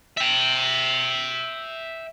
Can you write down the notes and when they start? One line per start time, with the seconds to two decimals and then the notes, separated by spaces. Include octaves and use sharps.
0.17 E5 G5